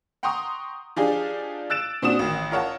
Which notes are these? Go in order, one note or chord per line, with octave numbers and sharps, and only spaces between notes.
F#5 G5 A#5 C6 C#6 D#6
F3 D4 D#4 F4 G4 G#4
E6 F#6 A6 D7 E7
A#2 C4 D4 F#4 D#6 E7
A1 D#3
F4 A#4 C#5 F#5 A5